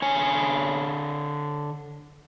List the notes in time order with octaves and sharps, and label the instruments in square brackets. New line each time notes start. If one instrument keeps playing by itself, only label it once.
[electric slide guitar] D3 C#5 G#5